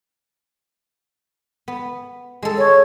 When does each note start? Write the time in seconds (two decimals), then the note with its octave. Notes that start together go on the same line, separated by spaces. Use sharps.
1.68 B3
2.42 G#3 A4
2.58 C#5